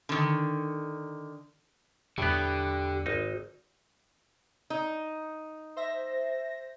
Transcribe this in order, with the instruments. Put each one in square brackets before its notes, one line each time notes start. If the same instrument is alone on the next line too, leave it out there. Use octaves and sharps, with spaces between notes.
[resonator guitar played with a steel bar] D3 D#3
[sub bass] E2 [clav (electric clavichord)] A2 B3 [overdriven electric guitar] D3 [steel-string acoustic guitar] G3 G4
[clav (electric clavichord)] G#1 D#4
[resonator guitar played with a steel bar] D#4
[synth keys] C5 E5 A#6